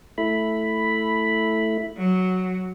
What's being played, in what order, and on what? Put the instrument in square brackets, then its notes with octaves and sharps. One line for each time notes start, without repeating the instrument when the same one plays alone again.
[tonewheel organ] A3 E4 B5
[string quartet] F#3